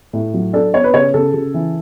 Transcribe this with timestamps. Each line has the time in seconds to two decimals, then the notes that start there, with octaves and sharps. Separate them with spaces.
0.13 A2
0.34 F#3
0.53 D4 A4
0.73 B3 C#5
0.84 B4
0.94 C#3 C#5
1.14 C#3 A4
1.34 C#3
1.54 E3